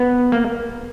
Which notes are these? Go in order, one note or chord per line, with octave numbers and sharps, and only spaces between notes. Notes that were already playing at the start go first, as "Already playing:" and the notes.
Already playing: B3
A#3